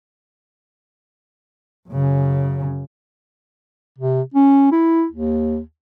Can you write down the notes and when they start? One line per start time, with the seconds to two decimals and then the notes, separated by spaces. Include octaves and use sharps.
1.89 F#2 C#3
3.98 C3
4.34 C#4
4.72 E4
5.11 D#2